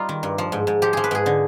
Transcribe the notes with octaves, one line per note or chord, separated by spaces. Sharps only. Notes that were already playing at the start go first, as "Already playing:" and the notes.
Already playing: G3 D#4 F4
D#3
G2
F3
G#2
G#2
F3 G4
F3 G#4
B4
G#2 G#4
D3